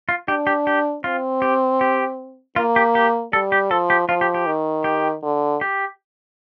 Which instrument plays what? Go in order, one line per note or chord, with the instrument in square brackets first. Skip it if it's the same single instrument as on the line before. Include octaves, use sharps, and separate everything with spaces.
[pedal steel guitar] F4
[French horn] D4 [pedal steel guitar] G4
[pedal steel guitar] G4
G4
[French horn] C4 [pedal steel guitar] F4
[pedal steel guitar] G4
G4
[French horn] A#3 [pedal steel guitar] F4
[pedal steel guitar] G4
G4
[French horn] G3 [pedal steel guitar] A4
[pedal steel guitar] G4
[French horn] F3 [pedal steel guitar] A4
[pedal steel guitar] G4
[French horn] F3 [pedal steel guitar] F4
[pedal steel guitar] G4
G4
[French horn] D#3
[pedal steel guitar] G4
[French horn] D3
[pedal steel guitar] G4